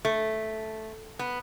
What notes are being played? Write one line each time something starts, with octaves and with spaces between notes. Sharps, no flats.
A3
B3